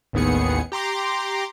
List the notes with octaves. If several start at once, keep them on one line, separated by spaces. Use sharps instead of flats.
A1 D#2 D#3 B3 G#4 C#7
G4 A#5 C6 D6